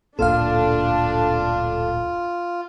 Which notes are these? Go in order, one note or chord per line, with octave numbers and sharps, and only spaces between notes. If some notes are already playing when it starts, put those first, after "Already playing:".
D1 G1 A#2 D4 F4 A4 F5